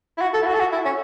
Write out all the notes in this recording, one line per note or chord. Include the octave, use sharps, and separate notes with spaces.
E4
F#4
A4
E4
F#4
A4
F#4
E4
C#4